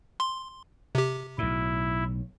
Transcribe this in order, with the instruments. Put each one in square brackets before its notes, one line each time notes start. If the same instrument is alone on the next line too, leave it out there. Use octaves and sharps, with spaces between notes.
[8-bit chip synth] C6
C3 G4
[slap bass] B1 A2 [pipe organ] E4